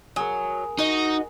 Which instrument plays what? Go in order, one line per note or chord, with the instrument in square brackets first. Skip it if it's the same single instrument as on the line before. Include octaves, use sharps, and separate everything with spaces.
[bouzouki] F#3 [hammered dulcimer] G#4 A#4
[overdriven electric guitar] D#4 [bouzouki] F#4 D#5